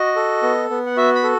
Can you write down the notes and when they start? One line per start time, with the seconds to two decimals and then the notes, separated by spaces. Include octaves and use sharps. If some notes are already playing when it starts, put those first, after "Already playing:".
Already playing: F#4 D#5
0.16 A4
0.43 B3
0.70 B3
0.86 F#5
0.97 F#4 E5
1.15 B5
1.24 A4